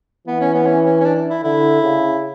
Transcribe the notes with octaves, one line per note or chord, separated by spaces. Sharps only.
E3 B3
C#4
B3
C#4
C#4
C#4
D4
E4
D3 E4
C#3